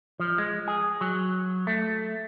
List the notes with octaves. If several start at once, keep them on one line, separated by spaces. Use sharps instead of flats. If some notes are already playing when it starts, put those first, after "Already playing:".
F3
G#3
G#4
F#3
A3